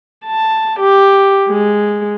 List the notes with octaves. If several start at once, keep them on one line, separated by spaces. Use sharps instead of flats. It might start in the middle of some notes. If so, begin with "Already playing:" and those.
A5
G4
G#3